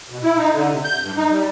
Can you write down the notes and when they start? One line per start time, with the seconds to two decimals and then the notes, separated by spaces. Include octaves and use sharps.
0.10 B2
0.23 E4
0.37 D#4
0.53 D3
0.70 C3
0.84 G6
1.01 G2
1.17 D#4
1.31 G3